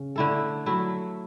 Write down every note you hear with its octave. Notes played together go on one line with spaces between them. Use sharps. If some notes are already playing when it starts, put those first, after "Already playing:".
Already playing: C#3
D3 A3 E4 A4
F#3 A3 E4